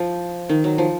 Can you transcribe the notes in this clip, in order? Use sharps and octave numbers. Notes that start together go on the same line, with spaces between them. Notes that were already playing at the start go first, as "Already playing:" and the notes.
Already playing: F3
D#3
F#3
F3